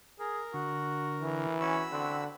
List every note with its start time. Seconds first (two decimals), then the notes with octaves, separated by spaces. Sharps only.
0.20 G#4 A#4
0.54 D3 F#4
1.21 E3
1.61 C#4 F#4 B5 E6
1.92 D3 C4 F#5